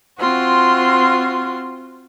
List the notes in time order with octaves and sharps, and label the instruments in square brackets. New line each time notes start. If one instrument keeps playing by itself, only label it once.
[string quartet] C4 F4 F#4 C6